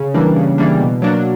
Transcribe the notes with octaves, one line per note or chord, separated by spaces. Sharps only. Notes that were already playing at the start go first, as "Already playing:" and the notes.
Already playing: C#3
E3 G3 A#3 D4
C#3
E3 G3 A#3 D4
B2
F#3 A#3 D4